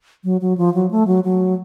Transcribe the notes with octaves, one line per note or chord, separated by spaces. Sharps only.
F#3
F#3
F3
F#3
A3
F#3
F#3